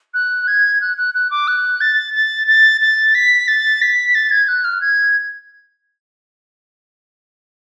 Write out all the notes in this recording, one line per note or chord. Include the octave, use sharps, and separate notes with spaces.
F#6
G#6
F#6
F#6
F#6
D6
F#6
A6
A6
A6
A6
B6
A6
B6
A6
G#6
F#6
F6
G#6